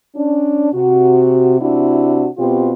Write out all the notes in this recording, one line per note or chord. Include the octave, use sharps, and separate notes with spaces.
C#4 D4
C3 F#4
C3 D4 E4 F#4
B2 C4 F4 G4